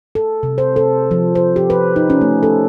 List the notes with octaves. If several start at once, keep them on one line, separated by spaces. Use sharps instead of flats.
A4
C3
C5
A4
F3
C5
G4
B4
D#4
C#4
A3
A4